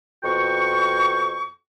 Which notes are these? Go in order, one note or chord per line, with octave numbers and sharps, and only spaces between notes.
F2 B2 F#4 G5 C#6